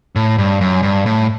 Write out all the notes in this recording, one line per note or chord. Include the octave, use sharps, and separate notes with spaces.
A2
G2
F#2
G2
A2